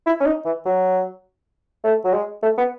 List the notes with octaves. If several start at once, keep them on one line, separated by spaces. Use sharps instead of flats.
E4
C#4
D#4
E3
F#3
A3
F#3
G#3
A3
B3